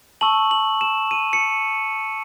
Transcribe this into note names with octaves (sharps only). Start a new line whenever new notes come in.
A5 C#6 E6 F#7
F#7
E7
D#7
C#7